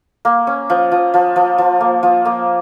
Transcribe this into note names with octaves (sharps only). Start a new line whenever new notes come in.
A#3
C#4
F3
F3
F3
F3
F3
A#3
F3
A#3